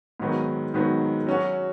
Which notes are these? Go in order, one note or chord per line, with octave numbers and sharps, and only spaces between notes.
G#2 D#3 F#3 B3
G#2 D#3 F#3 B3
F#3 C#4 F#4